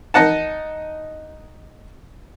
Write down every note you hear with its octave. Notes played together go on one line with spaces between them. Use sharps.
D#4 D#5 F#5 A5